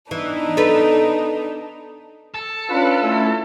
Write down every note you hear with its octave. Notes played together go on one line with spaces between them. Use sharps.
E3 B3 D4 D#4
A4 B4
A4
C#4 D4 F4 B4
A3 C#4 E4